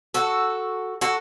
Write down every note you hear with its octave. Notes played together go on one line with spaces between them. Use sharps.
F#4 A4
F#4 A4